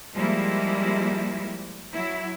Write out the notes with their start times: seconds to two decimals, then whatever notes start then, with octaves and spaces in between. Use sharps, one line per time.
0.14 F3 G3 G#3 A#3 E4
1.92 F#3 E4